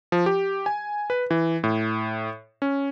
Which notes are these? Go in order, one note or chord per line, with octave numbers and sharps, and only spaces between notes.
F3
G4
G#5
B4
E3
A2
C#4